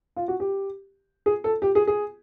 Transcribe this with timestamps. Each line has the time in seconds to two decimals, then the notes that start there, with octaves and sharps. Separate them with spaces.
0.17 F4
0.28 F#4
0.40 G4
1.26 G#4
1.44 A4
1.62 G4
1.75 G#4
1.87 G#4